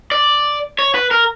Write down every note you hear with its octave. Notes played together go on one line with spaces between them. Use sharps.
D5
C#5
B4
A#4